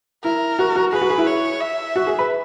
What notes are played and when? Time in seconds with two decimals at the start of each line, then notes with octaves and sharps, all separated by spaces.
0.24 E4 A#4
0.59 F#4
0.76 F#4
0.92 G#4 B4
1.02 F#4
1.10 G#4
1.18 E4
1.27 C#5
1.61 E5
1.96 F#4
2.07 G#4
2.19 B4